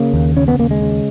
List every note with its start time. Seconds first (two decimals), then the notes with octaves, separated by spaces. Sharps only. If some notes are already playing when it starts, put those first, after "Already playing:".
Already playing: C#3 A#3
0.14 D#2
0.37 C#3 C#4
0.48 B3
0.59 D#2 A#3
0.71 G#3
0.81 C#3